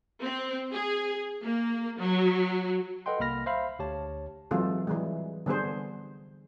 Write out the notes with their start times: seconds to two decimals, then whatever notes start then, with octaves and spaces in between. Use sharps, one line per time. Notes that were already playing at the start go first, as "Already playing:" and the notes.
0.23 C4
0.74 G#4
1.43 A#3
2.00 F#3
3.06 A4 B4 D#5 F#5 G5 C6
3.20 C2 A#3 B5 F6 A#6
3.46 C5 E5 F5 B5
3.79 D2 G4 C#5 A5
4.51 E3 F#3 G#3 C4 F4 A4
4.87 E3 G3 G#3
5.46 D3 G3 B3 G#4 C5